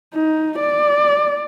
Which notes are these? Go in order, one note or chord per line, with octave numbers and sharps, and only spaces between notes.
D#4
D5